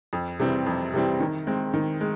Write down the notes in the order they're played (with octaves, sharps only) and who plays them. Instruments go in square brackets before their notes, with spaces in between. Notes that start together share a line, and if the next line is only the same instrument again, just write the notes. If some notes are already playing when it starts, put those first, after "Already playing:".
[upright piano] F2
C3 E3 G3 C4
F2
C3 E3 G3 C4
D#3
G#3 C4
D#3
G#3